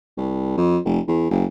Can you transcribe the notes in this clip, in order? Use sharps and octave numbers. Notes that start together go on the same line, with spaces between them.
C2
F2
F1
E2
F#1